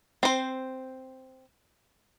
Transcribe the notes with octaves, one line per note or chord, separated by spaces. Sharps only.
C4 C5